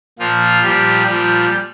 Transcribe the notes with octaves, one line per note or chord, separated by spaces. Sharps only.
A#2 F3 F4
A#2 F3 G3 G4
A#2 F3 G3 G4